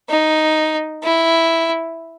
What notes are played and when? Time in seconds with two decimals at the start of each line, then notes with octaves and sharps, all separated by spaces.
0.09 D#4
1.04 E4